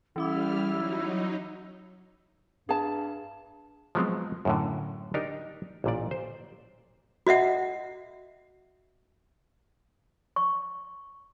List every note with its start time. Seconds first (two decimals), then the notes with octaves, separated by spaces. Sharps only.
0.16 E3 G3 C#4 E4 D6 F6
0.68 F#3 D#4
2.69 G2 G#4 A5
3.95 F3 F#3 G#3 B3 C4
4.45 F#2 A2 D3
5.14 D4 D#4 G4 A#4
5.84 A1 A#2 D5
6.11 C5
7.27 F#4 D#5 E5 F#5
10.36 C#6